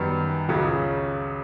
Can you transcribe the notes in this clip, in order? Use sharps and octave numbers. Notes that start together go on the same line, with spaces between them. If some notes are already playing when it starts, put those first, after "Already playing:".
Already playing: F#2 D#3 G3 B3
C#2 C#3 F#3